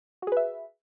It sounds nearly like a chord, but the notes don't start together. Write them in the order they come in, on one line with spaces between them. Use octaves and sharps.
F#4 G#4 B4 E5